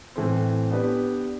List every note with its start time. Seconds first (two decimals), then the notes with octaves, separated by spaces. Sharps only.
0.16 A2 E3 A3 C4
0.71 B3 D4 G4 B4 D5